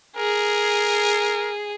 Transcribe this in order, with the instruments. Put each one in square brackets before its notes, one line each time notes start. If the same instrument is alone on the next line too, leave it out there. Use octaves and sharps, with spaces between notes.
[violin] G#4 [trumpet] A#4